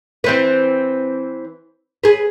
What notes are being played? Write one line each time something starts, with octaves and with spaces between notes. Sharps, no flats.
E3 C4 B4
G#4 B4